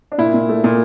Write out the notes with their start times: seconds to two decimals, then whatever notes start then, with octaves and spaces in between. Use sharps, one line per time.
0.12 D4
0.18 A#2 E4
0.34 A#2
0.49 A3
0.64 A#2